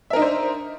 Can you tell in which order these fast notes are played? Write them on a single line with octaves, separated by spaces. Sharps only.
E5 A#4 D#4 D4 C5